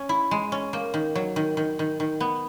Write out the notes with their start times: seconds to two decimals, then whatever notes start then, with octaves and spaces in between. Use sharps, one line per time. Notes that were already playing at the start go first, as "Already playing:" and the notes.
Already playing: C#4
0.09 E4
0.31 G#3
0.52 C#4
0.73 A#3
0.94 D#3
1.16 F#3
1.36 D#3
1.57 D#3
1.79 D#3
2.00 D#3
2.20 B3